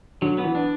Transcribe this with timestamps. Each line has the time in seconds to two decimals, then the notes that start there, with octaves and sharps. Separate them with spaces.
0.22 D3 F#3
0.38 B3
0.44 E3
0.55 D4